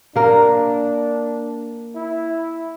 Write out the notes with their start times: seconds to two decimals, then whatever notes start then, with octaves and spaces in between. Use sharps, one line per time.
0.16 A#3 D4 A#4
1.95 E4